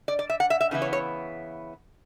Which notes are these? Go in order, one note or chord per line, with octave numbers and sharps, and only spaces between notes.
D5
D5
E5
F#5
E5
E5
C#3 E3 B3 E4
C#5
C#5